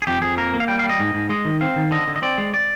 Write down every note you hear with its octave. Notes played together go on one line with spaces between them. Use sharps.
G#4
F2 G4
F2 G#4
A#3 A#4
A#3
F5
G3 G5
F5
G3
D#5
G#2
G#2
G#3 D#5
D#3
C4 F5
D#3
D3 D#5
D3
D#5
C4 D5
G#3
D5